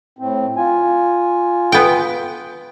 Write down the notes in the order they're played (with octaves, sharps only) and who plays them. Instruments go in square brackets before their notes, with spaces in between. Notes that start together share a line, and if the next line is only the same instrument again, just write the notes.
[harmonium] A2 C4
F4 G#5
[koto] B3 G5